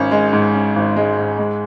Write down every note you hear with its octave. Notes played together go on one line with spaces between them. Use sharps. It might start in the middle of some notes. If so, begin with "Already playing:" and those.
Already playing: G#1 C#4
G#3
G#2
C#4
G#1
G#3
G#2
G#3